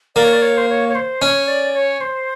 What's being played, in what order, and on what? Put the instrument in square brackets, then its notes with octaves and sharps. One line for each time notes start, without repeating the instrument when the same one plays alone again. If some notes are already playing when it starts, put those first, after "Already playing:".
[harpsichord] A#3 [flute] D5
[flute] C#5
D5
C#5
C5
C#5
C#5
C5
[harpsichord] C#4 [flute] C#5
[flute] D5
C#5
C5